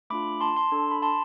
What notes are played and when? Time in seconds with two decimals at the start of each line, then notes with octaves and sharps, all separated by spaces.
0.10 A3 D4 F4 B5 D6
0.41 A5 C6
0.56 A5 C6
0.72 D4 A4
0.91 B5
1.02 A5 C6